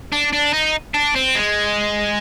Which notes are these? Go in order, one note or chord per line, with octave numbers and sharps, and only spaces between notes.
D4
D4
D#4
D4
C4
G#3